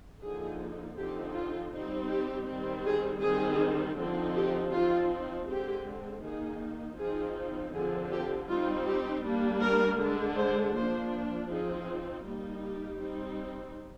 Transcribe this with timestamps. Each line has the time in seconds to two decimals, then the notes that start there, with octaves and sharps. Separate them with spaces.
0.22 D3 F3 A#3 D#4 G#4
0.97 D3 F3 C4 D#4 G4
1.35 F4
1.73 G3 C4 D#4
2.10 G4
2.47 D#3 G3 C4
2.85 G#4
3.23 D#3 G3 C4 G#4
3.98 D3 F3 C4 D#4
4.36 G4
4.73 F3 C4 D#4 F4
5.48 D3 G#3 C4 G4
6.23 D#3 A#3 D#4 G#4
6.98 F3 C4 D#4 G#4
7.73 D3 F3 C4 G#4
8.11 G4
8.49 G3 C4 D#4 F4
8.87 G4
9.23 G3 A#3 D4
9.62 A#4
9.99 D3 G#3 D4
10.36 C5
10.75 F3 A#3 D4 C5
11.49 F3 C4 D#4 G#4
12.24 G3 A#3 D#4
12.62 G4
12.99 G3 C4 D#4